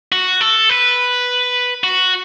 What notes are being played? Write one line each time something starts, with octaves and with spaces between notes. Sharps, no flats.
F#4
A4
B4
F#4